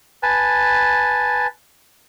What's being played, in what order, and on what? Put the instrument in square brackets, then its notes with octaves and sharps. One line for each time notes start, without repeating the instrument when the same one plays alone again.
[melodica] B4 G#5 A5